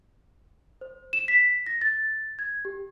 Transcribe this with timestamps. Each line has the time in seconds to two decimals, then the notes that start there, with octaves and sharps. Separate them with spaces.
0.81 C5
1.13 E7
1.28 B6
1.66 A#6
1.81 A6
2.39 G#6
2.65 G4